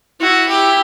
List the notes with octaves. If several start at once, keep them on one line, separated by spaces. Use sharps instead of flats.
E4 F#4
G4